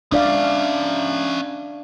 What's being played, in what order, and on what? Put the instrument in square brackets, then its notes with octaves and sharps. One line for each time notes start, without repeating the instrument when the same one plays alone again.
[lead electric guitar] C#4 E5 [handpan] D4 D5 F5